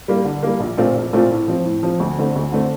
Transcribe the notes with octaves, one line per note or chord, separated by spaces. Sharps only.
G3 A#3
D3
G3 A#3
A#1
A#2 A3 C4 F4
A#1
A#2 A3 C4 F4
A2
F3 C4
A2
F3 C4
D2
D3 A3 C4
D2
D3 A3 C4